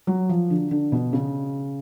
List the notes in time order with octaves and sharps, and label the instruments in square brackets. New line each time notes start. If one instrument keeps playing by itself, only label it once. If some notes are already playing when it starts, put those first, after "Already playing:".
[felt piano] F#3
F3
D3
D3
B2
C#3